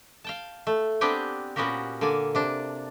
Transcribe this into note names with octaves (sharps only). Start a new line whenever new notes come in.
F5 G5 A5
A3
B3 C4 D4 G4 G5 G#5
A#2 B3 C#4 F#4 G4 A#4
D3 A#3 D5 G#5
C3 D4